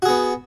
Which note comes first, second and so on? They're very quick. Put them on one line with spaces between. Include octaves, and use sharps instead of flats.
F#4 G#4 B3